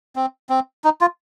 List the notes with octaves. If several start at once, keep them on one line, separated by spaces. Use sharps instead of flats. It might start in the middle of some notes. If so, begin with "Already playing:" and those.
C4
C4
D#4
F4